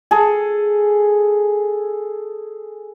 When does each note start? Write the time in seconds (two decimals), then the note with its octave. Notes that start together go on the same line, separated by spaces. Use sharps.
0.11 G#4 A4